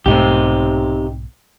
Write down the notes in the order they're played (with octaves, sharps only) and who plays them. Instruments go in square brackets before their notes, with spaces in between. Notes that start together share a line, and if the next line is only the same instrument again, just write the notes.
[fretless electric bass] B1 G#2 A3 [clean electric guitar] C3 D#4 G4